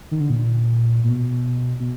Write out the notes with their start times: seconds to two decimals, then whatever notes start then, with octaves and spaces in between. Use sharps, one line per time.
0.11 D#3
0.20 D3
0.30 A#2
1.04 A#2
1.10 B2
1.80 B2